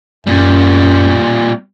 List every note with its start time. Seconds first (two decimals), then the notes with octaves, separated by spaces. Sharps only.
0.27 F#2 A#2 G3